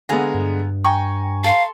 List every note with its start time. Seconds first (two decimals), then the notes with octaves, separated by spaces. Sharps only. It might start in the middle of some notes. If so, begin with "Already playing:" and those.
0.09 D3 G#3 B3 F5 G#5 A#5
0.34 G2
0.84 G5 G#5 A#5 C#6
1.44 A4 F5 C6